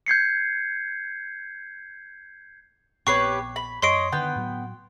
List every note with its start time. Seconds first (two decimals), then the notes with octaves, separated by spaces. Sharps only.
0.06 G6 G#6 C7 C#7
3.07 A#1 B3 C4 G4 B4 C#5 C#6 C7
3.56 B5
3.82 F#2 C#5 D#5 C6 C7 D7
4.12 D3 D#3 B3 G5
4.36 A2 F#3